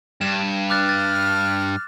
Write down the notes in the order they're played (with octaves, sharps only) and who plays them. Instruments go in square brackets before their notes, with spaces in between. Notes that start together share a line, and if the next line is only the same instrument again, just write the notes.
[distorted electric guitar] G2 [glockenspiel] E7
[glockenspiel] D6 F#6 A6 [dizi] F6
[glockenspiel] A6